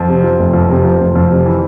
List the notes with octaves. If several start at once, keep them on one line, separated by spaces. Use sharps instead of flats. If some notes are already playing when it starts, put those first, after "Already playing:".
Already playing: F2
C3
F3
F1
F2
C3
F3
F1
F2
C3
E3